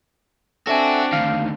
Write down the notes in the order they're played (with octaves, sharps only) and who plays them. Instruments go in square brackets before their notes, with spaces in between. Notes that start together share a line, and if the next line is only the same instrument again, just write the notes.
[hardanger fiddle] C4 D4 [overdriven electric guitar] F#4 [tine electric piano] A4 E5 G#5
[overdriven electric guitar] D2 D#3 [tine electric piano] F5